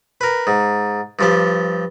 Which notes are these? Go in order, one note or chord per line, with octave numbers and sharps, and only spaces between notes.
A#4 B4
G#2
G2 F3 G4